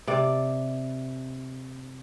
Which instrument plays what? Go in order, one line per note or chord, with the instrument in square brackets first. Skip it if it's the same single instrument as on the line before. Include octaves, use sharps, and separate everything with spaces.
[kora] C3 D5